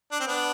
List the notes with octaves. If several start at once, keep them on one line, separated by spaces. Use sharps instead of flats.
D4
C4
B3 D4